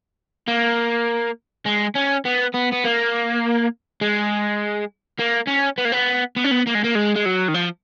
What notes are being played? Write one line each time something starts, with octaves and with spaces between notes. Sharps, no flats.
A#3
G#3
C#4
B3
B3
B3
A#3
G#3
A#3
C#4
B3
A#3
B3
B3
C#4
B3
A#3
G#3
A#3
G#3
G#3
F#3
D#3
F3